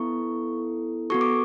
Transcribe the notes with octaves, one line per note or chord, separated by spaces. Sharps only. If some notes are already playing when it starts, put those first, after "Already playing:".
Already playing: B3 E4 A4 C#6
B3 F#4 A4 C#6
D6